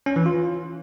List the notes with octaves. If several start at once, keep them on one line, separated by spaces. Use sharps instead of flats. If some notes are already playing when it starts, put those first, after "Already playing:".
C#4
E3
F4